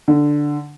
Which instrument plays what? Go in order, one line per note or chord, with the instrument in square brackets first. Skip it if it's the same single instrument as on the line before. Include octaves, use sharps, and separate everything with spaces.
[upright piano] D3